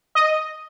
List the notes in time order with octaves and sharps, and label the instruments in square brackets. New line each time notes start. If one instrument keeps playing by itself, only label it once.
[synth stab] D#5